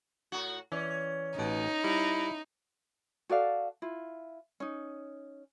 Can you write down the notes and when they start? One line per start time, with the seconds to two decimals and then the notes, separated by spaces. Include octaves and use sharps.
0.32 A2 F#4
0.72 E3 C#4 D5
1.38 A1 B2 D#4
1.84 G3 E4
3.30 F#4 A4 D5 F5
3.82 E4 F4
4.60 C#4 D#4